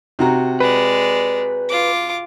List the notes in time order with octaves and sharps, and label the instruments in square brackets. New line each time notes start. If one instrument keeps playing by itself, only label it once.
[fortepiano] C3 F#4 A#5
[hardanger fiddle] G#3 D5 [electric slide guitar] B4
[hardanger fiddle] F4 D6